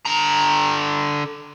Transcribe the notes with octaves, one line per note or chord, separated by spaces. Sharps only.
D3 A#5